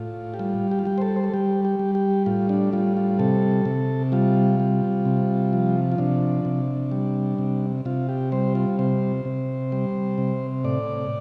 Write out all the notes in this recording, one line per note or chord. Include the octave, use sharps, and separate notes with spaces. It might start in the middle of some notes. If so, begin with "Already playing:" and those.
Already playing: A2 F4
G4
G3 F4
G4
F4
G3 G4
C5
A4
C5
A4
G3 G4
G4
G3
G4
A2 F4
D4
G3 F4
F4
C3 A4
C3
G3 F4
G3
C3
F3
F4
C3 D4
C3
G3
C3
C3 F4
G4
G3 C5
F4
C3 C5
C3
G3
C3
A2 D5